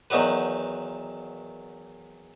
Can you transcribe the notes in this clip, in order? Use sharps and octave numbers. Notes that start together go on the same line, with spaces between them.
E2 D#3 F#3 F#4 B4